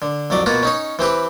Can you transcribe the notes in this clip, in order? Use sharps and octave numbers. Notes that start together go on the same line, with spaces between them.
D3
C2 F2 F#3 D5
B2 A#3 F4 F#4
C#4 D#4 C#5
E3 C4 G4 B4